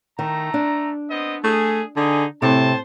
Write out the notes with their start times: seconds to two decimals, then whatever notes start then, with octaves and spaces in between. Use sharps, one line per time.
0.19 D#3 A3 A#5
0.54 D4
1.10 B3 C4 D#5
1.44 A3 G#4
1.96 D3 D#4 G#4 G#5
2.42 A2 C3 C5 A5